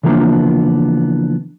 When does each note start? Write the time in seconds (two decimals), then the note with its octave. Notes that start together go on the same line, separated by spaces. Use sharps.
0.03 C#3 E3 F3 A#3 B3 D4